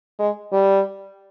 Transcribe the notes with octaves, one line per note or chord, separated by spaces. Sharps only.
G#3
G3